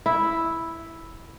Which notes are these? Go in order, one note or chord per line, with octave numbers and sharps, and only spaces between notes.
E4